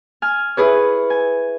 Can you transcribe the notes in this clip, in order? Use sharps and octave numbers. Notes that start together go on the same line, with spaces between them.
G#5 F6
E4 G#4 B4 C#5
G#5